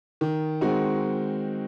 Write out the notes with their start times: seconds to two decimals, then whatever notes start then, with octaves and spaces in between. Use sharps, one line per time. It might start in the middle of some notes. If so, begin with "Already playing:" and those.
0.21 D#3
0.61 G#3 C4 D#4 F#4